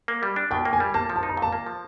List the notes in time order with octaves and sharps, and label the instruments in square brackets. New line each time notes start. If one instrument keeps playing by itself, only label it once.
[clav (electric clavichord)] A#3
G3
D4
[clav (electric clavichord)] B2 [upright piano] G5
[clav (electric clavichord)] A#3
[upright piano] G#5
[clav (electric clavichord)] G3
[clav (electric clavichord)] A#3 [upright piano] A5
[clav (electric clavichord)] F3
[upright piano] A5
[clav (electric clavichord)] D#4
[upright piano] A#5
[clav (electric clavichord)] A#2 [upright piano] A5
[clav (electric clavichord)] A#3
F3